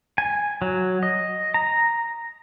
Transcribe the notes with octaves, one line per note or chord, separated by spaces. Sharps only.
G#5
F#3
D#5
A#5